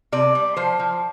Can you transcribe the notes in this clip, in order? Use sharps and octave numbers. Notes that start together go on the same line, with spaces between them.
C3 D5
G3
F3 C5
F3